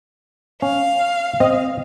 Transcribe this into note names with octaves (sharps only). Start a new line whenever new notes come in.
C#4 F5
C4 D#5